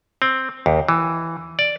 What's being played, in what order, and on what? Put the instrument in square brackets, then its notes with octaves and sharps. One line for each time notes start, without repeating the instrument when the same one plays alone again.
[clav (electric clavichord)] C4
D#2
E3
D5